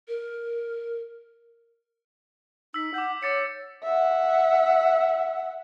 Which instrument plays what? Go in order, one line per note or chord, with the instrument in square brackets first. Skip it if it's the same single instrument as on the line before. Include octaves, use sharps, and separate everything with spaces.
[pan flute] A#4
[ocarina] D#4 [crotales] E6 B6
[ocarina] F#5 [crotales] D6 G6
[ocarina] C#5 [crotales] D6 A6 C#7
[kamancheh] E5 F#5